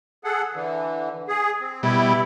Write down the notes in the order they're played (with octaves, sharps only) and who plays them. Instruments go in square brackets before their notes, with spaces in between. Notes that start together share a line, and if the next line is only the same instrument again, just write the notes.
[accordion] G#4 A4 F#5
D3 E3
G#4
C4
[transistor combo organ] B2 G3 [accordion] E4